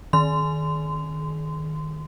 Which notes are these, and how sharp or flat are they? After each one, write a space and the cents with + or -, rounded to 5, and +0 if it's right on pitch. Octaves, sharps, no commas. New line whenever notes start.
D#3 -5 C6 -25